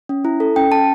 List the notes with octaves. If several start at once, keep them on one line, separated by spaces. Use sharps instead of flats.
C#4
E4
A4
C#4 G5
C#4 A5